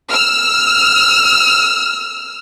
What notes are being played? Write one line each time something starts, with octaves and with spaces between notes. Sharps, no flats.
E6 F6